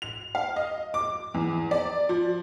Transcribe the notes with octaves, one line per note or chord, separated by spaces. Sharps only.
F7
F5
D#5
D6
E2
D5
F3